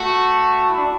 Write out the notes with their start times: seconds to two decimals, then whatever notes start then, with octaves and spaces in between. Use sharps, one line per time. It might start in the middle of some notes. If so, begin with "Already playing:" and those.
Already playing: A3 F#4
0.70 E4
0.77 D4